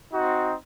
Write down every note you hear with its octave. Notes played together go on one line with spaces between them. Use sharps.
C4 D#4 F#4